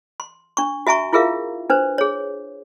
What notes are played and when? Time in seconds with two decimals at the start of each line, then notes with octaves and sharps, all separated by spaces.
0.20 C6
0.57 D4 C#6
0.87 F#4 E5 G#5 A#5 C#6
1.13 E4 F4 G#4 A#4 E5 F5
1.70 D4 B4 C5
1.98 G#4 C#5